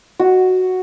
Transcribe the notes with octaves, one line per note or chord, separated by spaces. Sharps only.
F#4